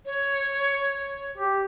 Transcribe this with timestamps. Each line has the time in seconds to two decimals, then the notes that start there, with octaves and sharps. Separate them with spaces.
0.05 C#5
1.38 G4